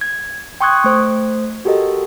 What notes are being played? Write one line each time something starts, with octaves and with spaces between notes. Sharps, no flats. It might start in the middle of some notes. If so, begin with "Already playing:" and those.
G#6
G5 C6 C#6 D#6 F#6 G#6
A3 C5
F#4 G4 A4 A#4 D#5